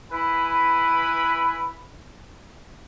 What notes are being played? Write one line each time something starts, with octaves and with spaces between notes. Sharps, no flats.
E4 B4 G#5 B5